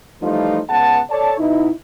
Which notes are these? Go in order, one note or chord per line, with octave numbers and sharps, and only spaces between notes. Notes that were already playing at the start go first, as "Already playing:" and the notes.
E3 F3 G3 A3 D#4 F4
C#2 B3 F#5 A5
A4 C#5 D5 A5
B2 D#4 E4